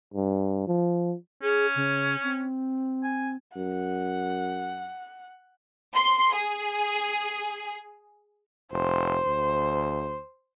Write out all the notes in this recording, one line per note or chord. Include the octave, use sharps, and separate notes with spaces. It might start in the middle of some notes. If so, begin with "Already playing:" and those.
G2
F3
C#4 G#4
C#3
C4
G#5
F#2 F#5
C6
G#4
F1 C5
D2